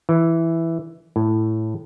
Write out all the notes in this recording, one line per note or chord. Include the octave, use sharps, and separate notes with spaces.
E3
A2